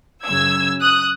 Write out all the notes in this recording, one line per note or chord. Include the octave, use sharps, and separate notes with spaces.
F#2 C#3 F#3 E6 G#6
D#6 F#6